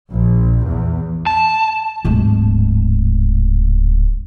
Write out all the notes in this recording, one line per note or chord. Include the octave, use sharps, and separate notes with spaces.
A#1
E2
A5
D1 G#2